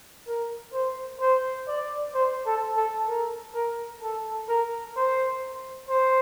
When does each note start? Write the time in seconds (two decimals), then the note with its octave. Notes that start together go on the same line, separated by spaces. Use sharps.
0.28 A#4
0.73 C5
1.21 C5
1.67 D5
2.15 C5
2.46 A4
2.77 A4
3.08 A#4
3.54 A#4
4.02 A4
4.48 A#4
4.96 C5
5.89 C5